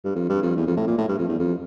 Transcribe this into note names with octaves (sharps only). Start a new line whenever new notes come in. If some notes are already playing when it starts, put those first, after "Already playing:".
G2
F2
G2
F2
E2
F2
A2
A#2
A2
G2
F2
E2
F2